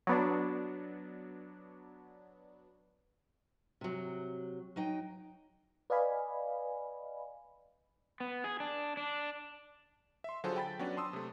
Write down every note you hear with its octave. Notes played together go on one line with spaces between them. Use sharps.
F#3 B3 D4
C3 F#3
F#3 D#4 G5
B4 D5 D#5 F5 G#5 B5
B3
G#4
D4
D4
E5 C6
D3 F#3 F4 G#4 A4 C5
G5 B5 A6
F#3 B3 C#4 D4
A5 C6 D#6 E6
C3 A3